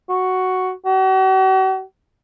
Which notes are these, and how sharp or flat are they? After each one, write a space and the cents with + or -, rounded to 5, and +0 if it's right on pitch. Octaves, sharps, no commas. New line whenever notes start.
F#4 +5
F#4 +45